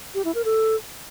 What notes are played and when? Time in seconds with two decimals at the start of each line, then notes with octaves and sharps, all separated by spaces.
0.15 G4
0.25 E4
0.35 A#4
0.45 A4